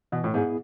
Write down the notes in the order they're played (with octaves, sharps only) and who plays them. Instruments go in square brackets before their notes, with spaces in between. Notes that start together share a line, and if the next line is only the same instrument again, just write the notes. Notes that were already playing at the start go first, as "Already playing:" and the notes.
[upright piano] B2 [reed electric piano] E3
[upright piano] A2
[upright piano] G#2 [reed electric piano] B3 E4 G#4